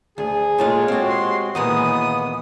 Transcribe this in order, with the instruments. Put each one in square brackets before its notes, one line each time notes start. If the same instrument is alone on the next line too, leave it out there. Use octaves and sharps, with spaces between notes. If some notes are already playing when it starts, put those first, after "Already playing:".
[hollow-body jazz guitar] D2 [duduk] G#4
[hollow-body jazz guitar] A#2 A3 F4 [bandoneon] G#3 [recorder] C#5
[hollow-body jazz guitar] C4 G4 [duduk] F#4
[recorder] C6
[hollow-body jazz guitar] D#2 A#2 G#3 [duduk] E3 [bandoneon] B3 [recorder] D#6